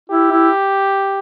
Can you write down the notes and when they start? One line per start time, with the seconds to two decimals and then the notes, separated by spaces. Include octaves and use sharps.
0.09 E4 G4
0.31 E4